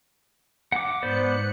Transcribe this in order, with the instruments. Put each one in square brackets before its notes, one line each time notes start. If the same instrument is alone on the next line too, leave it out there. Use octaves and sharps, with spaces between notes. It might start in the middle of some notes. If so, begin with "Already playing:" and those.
[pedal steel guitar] F#5 D6
[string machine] G#2 F#6 C#7 [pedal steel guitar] B3 C5 D5